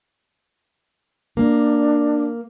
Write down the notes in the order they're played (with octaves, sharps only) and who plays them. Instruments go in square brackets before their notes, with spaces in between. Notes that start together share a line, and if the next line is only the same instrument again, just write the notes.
[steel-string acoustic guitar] A#3 [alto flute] D4